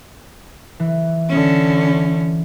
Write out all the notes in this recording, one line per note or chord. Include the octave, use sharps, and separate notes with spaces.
E3
D3 C#4